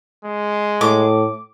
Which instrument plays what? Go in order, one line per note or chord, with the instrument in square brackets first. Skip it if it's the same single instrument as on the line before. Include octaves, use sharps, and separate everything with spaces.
[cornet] G#3
[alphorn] A2 [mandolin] D6